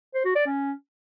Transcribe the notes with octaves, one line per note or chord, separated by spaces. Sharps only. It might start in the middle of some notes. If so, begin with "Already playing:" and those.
C5
F#4
D5
C#4